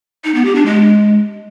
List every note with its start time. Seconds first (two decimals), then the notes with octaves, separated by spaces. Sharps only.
0.24 D#4
0.35 B3
0.45 G4
0.56 D4
0.66 G#3